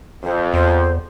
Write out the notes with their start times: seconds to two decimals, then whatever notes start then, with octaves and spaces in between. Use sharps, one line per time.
0.24 F2 C5
0.54 E2 C5